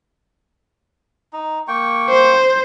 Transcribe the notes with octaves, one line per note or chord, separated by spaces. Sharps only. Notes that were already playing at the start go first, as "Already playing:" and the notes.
D#4
A#3 G5 C#6
C5